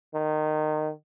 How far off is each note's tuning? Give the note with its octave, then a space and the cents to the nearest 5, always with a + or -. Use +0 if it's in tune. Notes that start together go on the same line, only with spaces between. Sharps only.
D#3 -20